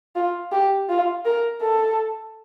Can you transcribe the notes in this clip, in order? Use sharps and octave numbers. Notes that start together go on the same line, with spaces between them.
F4
G4
F4
A#4
A4